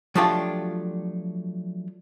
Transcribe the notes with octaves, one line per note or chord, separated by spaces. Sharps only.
F3 F#3 A3 D4 F4 G4